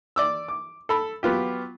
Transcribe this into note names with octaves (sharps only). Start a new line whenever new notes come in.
D5 D6 E6
D6
A4 B5
F#3 B3 F4 G4